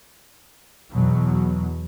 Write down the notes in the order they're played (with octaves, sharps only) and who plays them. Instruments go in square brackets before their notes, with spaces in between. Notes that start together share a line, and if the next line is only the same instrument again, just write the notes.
[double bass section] E2 B2 F#3